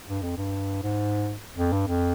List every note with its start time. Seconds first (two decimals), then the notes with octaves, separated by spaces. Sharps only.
0.08 G2
0.23 F2
0.37 G2
0.83 G#2
1.58 F2
1.73 G2
1.88 F2